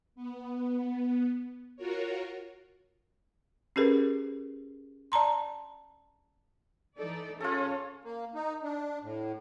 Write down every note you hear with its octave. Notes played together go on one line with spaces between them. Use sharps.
B3
F4 F#4 A#4 C#5
C#4 G4 G#4 A#4 B4
D5 A5 A#5 C6
E3 D#4 A4 D5
C#4 F4 G#4 A4 C#5
A#3
D#4
D4
A2